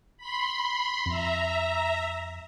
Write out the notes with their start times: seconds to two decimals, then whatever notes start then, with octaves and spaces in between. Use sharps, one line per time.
0.17 B5 C6
1.06 F2 E5 A#5